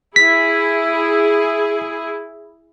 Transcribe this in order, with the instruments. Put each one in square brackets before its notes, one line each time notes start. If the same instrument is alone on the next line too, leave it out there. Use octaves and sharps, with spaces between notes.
[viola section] E4 G#4 [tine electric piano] B6